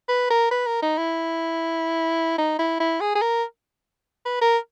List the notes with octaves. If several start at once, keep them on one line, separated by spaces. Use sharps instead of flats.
B4
A#4
B4
A#4
D#4
E4
D#4
E4
E4
G#4
G#4
A#4
B4
A#4